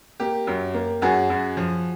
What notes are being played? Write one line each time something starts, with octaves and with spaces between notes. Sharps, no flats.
A#3 G4
F#2
A#3
F#2 F#4 G#4
F#2
F3